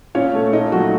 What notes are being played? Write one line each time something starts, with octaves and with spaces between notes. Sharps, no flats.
A#2 C#4 C#5
A3
A#2 D#4 D#5
F3 F#3 A3 F#4